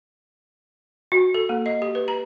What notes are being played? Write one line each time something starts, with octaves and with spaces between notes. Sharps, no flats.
F#4
A4
A#3
D#5
G4
B4
A#5